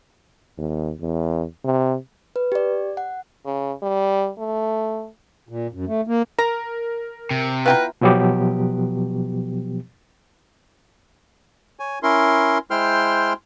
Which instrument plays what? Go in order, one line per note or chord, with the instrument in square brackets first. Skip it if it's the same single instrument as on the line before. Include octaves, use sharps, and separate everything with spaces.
[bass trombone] D#2
E2
C3
[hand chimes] B4
G4 D5
F#5
[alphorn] C#3
G3
A3
[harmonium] A#2
F#2
A3
A#3
[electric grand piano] A#4 [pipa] A#5
[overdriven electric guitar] C3
[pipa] B3 E4 F4 [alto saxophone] B4 [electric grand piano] F5 G5 A#5
[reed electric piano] B2 F3 F#3 B3 G4
[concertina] C#5 G#5
C#4 E4 A#4 C6
G#3 E4 C5 G5 C6 F6